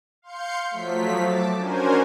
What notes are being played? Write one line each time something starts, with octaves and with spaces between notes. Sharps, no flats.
F5 C6 G6 C#7
F3 F#3 A3 B6
A5 D6
C#4 D4 F#4 A#4 C5 G#5